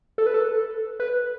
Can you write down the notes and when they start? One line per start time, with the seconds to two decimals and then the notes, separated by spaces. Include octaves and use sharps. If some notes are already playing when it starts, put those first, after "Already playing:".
0.18 A4
0.26 B4
0.34 A4
1.00 B4